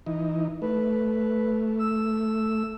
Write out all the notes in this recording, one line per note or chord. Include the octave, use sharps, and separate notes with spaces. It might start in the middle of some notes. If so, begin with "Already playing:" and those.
E3 D#4
A3 B4
E6